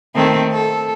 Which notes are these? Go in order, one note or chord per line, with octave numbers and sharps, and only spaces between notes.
D#3 A3 C4
A4